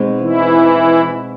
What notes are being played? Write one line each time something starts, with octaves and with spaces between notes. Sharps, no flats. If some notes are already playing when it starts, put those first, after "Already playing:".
Already playing: B2 G#3 C4 D#4
E3 E4